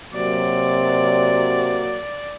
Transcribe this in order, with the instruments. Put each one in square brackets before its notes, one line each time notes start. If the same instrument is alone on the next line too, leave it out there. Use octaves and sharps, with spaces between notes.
[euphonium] C3 [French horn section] F#3 A#3 F#4 [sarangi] D5